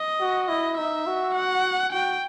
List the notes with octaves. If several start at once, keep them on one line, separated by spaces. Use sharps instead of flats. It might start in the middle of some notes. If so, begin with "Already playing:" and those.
Already playing: D#5
F#4
E4 D#5
D#4 E5
F#4
F#5
F#4 G5